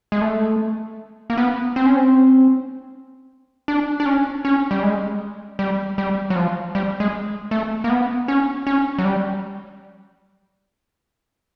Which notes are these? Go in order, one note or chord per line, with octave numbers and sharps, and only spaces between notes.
G#3
A3
A#3
B3
C4
C#4
C4
D4
D4
C#4
C#4
G3
G#3
G3
G3
F#3
F3
G3
G#3
A3
A#3
B3
C#4
C#4
F#3
G3